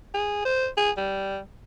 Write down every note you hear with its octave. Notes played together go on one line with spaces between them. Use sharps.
G#4
C5
G#4
G3